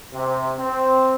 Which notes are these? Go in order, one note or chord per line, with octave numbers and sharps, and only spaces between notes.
C3
C4